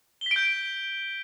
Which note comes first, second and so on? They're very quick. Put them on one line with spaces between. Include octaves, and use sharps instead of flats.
G7 B6 D7 G6